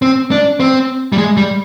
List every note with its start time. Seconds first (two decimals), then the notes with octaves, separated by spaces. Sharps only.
0.02 C4
0.31 D4
0.60 C4
1.12 G3
1.18 G#3
1.37 G3